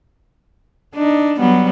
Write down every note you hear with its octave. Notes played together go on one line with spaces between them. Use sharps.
D4 D#4
F#3 G3 B3